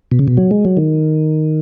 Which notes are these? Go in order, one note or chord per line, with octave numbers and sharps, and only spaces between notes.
B2
C#3
B2
F#3
G#3
F#3
D#3